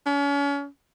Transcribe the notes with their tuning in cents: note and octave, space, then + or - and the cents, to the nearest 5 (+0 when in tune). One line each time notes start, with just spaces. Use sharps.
C#4 +35